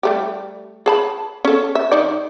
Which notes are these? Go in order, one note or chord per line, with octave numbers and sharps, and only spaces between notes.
G3 A3 G4
G#4 A5 B5
C#4 A4
E5
D#3 D#4 D5